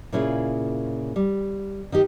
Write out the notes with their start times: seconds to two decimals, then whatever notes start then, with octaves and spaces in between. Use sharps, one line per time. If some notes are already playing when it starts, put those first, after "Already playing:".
0.12 A#2 C#3 C#4 E4 F4 G#4
1.16 G3
1.92 D#3 D#4 G4